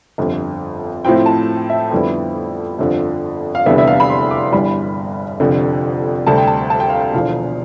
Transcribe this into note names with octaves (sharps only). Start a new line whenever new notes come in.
G1 F2 D3
A2 F3 C4 E4 G5
A5
E5
F2 D3 G3 B3 E4
G1 F2 D3 F3
F5
F1 E2 D3 G3 B3 E5
E5
F5
B5
C6
D6
G1 G2 E3 G3 B5
F1 F2 D3 F3
D2 C3 G3 C4 A5
G5
A5
A5
G5
F5
G5
E1 E2 D3 F3 F5